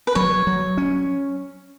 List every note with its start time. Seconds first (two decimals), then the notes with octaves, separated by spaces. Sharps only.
0.07 B4
0.15 F#3 C#5
0.47 F#3
0.77 C#4